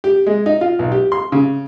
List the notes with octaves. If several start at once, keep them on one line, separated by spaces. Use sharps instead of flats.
G4
G#3
D#4
F4
B1
G4
C6
C#3